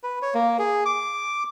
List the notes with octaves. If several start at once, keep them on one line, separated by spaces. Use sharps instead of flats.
B4
C#5
A#3
G#4
D6